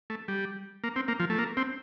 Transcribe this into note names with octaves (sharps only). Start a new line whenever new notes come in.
A3
G3
A#3
C4
A#3
F3
A3
A#3
C4